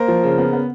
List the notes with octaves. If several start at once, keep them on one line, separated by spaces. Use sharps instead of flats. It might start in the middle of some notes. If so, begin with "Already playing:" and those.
Already playing: A#3 A#4 C5
F3
C#3
B3
B3